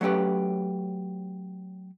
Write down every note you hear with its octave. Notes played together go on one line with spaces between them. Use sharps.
F#3 A3 C#4 G4 B4